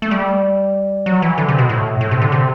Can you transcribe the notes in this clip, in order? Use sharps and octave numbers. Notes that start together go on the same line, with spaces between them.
A3
G3
F#3
E3
D3
C3
B2
A2
A2
C3
D3
C3